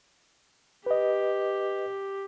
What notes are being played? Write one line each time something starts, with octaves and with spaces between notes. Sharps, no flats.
G4 B4 D#5